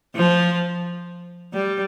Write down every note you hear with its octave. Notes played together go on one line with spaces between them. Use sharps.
F3
G3